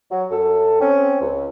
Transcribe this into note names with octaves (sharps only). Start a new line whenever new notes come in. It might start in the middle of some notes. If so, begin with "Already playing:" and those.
F#3
F#2 A4
C4 C#4
C#2